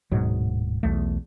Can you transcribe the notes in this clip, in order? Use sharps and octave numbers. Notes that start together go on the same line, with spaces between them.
D1 G#2 B2 F#3
B1 E2 A3